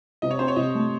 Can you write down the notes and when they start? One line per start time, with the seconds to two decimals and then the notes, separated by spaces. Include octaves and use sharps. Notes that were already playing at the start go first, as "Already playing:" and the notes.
0.22 C3 D#5
0.31 C#5
0.39 C4 C5
0.48 C#5
0.56 C3 D#5
0.75 A3